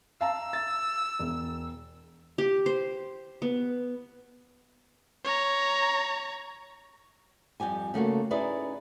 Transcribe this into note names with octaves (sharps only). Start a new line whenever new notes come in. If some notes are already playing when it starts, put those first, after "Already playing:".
F5 A5 A#5 E6
A6
E1
G4
C5
B3
C#5 A#5
F2 G3 G4 G#5
C#3 A3 A#3 F#4
C#4 D#4 E4 G#4 B4 D5